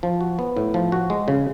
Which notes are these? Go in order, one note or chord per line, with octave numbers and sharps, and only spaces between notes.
F3
F#4
B3
A2
F3
F#4
G#3
C#3